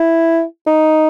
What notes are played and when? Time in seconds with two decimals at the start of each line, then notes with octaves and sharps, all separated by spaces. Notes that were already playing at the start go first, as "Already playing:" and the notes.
Already playing: E4
0.67 D#4